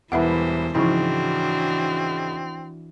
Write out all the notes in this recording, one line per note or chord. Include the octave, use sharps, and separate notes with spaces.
E1 E3 G3 E4 B4 C5 E5 F#5
G#2 C#3 E3 F3 C4 D4 E4 F#4